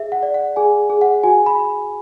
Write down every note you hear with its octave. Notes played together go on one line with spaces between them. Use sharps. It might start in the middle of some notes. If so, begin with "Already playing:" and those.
Already playing: G#4 E5
F#5
D5
F#5
G#4 G#5
G#4
F#5
F#4 G#5
B5